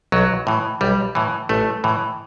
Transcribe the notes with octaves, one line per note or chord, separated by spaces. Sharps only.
B1 F#3
A2 E3
B1 G3
A2 E3
A1 A3
A2 E3